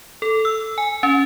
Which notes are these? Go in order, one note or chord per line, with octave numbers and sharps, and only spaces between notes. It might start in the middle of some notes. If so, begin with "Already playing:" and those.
A4
E6
G#5
C#4